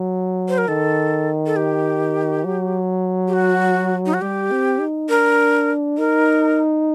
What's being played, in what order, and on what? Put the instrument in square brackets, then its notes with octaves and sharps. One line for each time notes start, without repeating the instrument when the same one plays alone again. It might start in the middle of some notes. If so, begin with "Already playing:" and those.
Already playing: [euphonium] F#3
[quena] C5
A#4
[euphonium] D#3 [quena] A4
[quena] A4
G4
[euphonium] F#3
[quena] G4
F#4
D#4
F#4
[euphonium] G3 [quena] G4
[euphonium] C4
D#4
[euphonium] D4 [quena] A#4
[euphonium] D#4 [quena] A#4